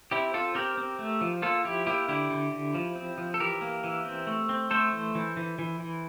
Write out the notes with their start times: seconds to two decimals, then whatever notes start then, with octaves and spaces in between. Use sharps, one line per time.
0.11 C4 E4 G4
0.34 C4 F4 A4
0.55 C4 G4 A#4
0.77 C4
0.99 A3
1.21 F3
1.42 A#3 F4 A4
1.64 F3 E4 G4
1.87 A#3 E4 G4
2.08 D3 E4 G4
2.30 D3
2.52 D3
2.74 F3
2.95 C4
3.18 F3
3.34 A4
3.40 E3 G4 A#4
3.61 A#3
3.84 E3
4.05 C4
4.27 A3
4.49 C4
4.71 A3 A4 C5
4.92 E3
5.15 E3
5.37 E3
5.59 E3
5.80 E3